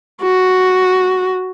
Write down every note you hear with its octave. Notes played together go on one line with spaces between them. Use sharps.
F#4